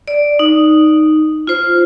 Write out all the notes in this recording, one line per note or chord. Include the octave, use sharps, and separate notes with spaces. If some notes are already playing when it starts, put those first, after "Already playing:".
D5
D#4
F4 C5